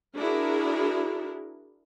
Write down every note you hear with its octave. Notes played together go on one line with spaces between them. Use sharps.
D4 E4 F#4 G#4 A#4